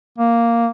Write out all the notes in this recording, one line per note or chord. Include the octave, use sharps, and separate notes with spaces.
A#3